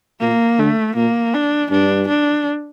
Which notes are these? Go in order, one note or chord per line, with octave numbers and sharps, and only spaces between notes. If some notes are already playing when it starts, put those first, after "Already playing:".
A#2 A#3
D3 A3
A#2 A#3
D4
G2 D4
D4